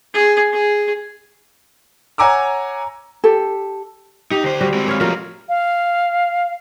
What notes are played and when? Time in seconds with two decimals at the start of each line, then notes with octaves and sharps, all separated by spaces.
0.14 G#4
0.53 G#4
2.18 C#5 F#5 G#5 A#5 D6 E6
3.24 G4 A4
4.31 D#4 G4
4.43 D2 C5
4.61 G3 F#4
4.74 G#3 C4
4.88 C#5 F5
5.01 F3 A3 A#3 F4 F#4
5.49 F5